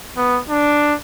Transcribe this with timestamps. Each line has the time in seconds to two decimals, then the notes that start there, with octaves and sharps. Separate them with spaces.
0.17 B3
0.49 D4